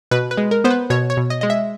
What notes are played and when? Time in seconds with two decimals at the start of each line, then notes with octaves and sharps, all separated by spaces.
0.11 B2 B4
0.31 B4
0.37 G#3
0.51 A#4
0.64 B3 C5
0.70 B4
0.90 B2 C#5
1.10 C#5
1.17 B2
1.30 D#5
1.41 G#3 D#5
1.50 E5